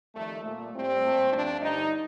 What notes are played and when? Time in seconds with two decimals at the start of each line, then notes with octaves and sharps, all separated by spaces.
0.15 F2 D#3 G3 A3
0.45 A#2 A3
0.74 A2 G3 C4
1.03 A#2 A3
1.32 G2 F3 A3 D4
1.61 G2 D3 G3 D#4